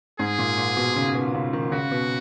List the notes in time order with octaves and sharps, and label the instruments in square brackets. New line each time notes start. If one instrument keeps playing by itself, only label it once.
[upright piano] G#2 [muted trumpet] G#4
[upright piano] A#2
A#2
B2
C#3
B2
C#3
D#3
[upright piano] C#3 [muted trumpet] F#4
[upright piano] B2